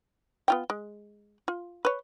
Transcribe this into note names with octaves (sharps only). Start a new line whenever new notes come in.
B3 F4 G5
G#3
F4
B4 C#5